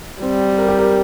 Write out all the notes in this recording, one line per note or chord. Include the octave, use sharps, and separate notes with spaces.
G3 C4
A#4
G4
A#4